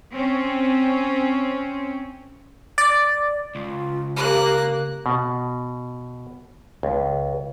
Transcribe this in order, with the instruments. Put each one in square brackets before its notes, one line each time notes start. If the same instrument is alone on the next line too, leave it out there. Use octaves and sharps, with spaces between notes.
[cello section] C4 C#4
[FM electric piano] D5
[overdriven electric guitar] C#2 [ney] F4
[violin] A#3 F#6 [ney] G4
[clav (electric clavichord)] B2
C#2